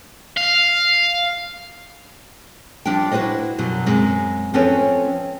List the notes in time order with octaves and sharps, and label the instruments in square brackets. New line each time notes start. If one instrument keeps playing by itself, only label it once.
[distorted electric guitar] F5
[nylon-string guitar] F3 G3 D4 F4 G5
E4 F#4 G#4 B4 C5 D#5
F#2 B2 F#3 G3
F#2 G#3 C4
F3 C4 C#4 A4 B4 C#5